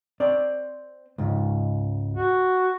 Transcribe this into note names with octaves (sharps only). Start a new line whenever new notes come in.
C4 D5
C#2 G#2
F#4